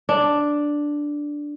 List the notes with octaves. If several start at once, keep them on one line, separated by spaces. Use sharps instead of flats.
D4